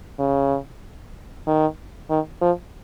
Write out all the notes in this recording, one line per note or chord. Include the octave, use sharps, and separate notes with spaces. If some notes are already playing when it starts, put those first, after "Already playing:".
C#3
D#3
D#3
F3